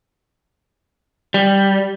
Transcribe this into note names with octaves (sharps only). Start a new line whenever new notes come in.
G3